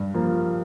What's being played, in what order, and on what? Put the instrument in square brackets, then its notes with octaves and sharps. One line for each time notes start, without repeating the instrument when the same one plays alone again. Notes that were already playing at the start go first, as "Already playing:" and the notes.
Already playing: [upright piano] G2
F3 A#3